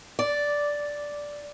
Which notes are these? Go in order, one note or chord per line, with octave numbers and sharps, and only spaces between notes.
D5